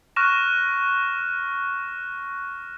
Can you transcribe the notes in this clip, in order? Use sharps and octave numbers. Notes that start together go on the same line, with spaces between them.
C#6 F6 F#6 A#6 E7